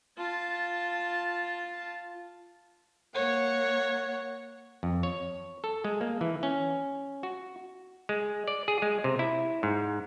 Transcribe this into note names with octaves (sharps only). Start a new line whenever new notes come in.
F4 A5
A#3 C#5 F#5
F2
C#5
A4
G#3
A#3
E3
C#4
F#4
G#3
D5
G#4
G#3
C3
E4
G#2